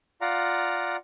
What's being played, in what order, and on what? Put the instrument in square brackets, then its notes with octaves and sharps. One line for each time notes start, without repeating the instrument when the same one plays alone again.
[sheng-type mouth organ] F4 D5 F5 F#5 A#5